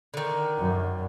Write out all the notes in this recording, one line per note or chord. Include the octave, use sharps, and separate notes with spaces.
D3 D#3
F#2